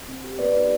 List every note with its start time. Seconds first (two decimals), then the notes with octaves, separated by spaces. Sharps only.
0.08 C4
0.24 G4
0.39 B3 B4 D5
0.55 D#4 G4 B4 D5